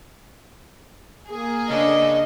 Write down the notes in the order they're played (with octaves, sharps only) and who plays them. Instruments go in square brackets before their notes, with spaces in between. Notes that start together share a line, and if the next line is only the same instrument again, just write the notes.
[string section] A#3 G#4
[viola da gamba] C#3 D4 A4 [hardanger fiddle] D#5